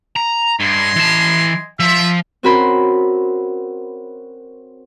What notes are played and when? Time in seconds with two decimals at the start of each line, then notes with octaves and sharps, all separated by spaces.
0.16 A#5
0.60 G2 D#5 G#5 C6
0.96 E3 A5
1.80 F3 E5
2.43 C4 C#4 F#4 A#4 B5 C6